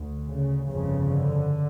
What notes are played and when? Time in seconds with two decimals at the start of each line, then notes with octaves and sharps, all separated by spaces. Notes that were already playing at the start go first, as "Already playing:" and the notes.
Already playing: D2
0.29 C#3
0.69 G1 F2 C#3
1.09 D3